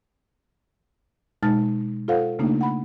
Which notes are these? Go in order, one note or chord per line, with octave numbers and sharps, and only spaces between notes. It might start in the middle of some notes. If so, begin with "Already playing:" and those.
B2 G#3 D#4 A5 F6 A6
F4 A4 C5 F5 F#5
C#3 A3 A#3 D4 D#4
F#5 B5